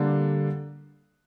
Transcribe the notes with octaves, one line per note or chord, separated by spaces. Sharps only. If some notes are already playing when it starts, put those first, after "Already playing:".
Already playing: D3 G3 A#3 D4